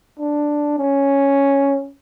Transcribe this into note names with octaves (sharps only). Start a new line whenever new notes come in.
D4
C#4